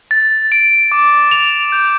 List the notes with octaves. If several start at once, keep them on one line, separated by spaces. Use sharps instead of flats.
A6
D7
D6
F7
G6